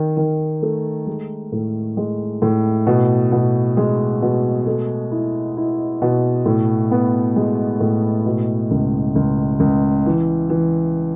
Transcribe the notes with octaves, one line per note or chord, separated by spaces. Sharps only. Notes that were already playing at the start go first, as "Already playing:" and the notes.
Already playing: D#3
D#3
A3
G#3
A2
G#3
A2
B2
B2
G#3
B2
A3
E4
E4
B2
A2
B3
G#3
A2
B2
C#2
C#2
C#2
E3
E3